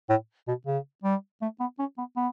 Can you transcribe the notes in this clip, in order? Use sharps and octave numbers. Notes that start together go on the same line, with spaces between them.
A2
B2
C#3
G3
A3
B3
C#4
B3
B3